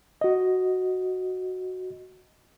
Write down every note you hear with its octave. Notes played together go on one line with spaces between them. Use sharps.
F#4 D#5